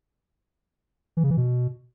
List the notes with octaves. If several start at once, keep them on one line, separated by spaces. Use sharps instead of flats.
E3
C#3
E3
B2